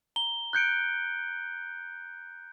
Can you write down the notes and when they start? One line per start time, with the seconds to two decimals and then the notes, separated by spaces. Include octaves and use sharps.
0.16 A#5 G7
0.53 F#6 G6 C#7 D7